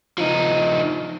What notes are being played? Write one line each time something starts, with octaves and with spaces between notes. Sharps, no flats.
F3 D#4